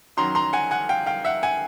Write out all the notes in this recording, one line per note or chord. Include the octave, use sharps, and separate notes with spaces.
F#2 D#3 F#3 A#5 C6
A#5 C6
F#5 G#5
F#5 G#5
F5 G5
F5 G5
E5 F#5
F#5 G#5